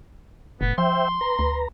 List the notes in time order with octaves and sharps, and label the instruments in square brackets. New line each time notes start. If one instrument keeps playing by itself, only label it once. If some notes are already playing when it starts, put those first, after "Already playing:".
[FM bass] F1 [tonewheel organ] A2 [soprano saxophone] B3
[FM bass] F3 [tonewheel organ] C5 E5 G5 [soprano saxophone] C6
[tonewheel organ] B4 A#5
[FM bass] D2